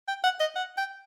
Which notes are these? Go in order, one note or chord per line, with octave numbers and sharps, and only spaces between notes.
G5
F#5
D#5
F#5
G5